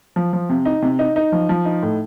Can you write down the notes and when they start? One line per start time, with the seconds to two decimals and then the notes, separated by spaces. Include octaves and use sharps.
0.16 F3
0.33 F3
0.49 C3
0.65 D#4
0.82 C3
0.99 D#4
1.16 D#4
1.32 F3
1.49 F3
1.65 D#4
1.83 A2